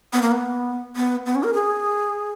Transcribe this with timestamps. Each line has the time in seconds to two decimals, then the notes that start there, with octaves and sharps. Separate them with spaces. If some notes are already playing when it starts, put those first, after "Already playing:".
0.13 B3
0.22 A#3
0.31 B3
0.96 B3
1.26 B3
1.35 C#4
1.43 A#4
1.54 G#4